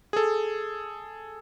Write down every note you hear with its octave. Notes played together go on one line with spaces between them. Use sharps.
G#4 A4